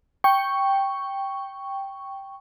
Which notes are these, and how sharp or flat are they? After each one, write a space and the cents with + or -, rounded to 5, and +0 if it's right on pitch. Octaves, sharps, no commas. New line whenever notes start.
G5 +0 C#6 +0